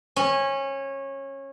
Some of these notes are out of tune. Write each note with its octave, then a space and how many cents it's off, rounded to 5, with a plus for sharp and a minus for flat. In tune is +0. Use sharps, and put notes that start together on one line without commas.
C#4 -20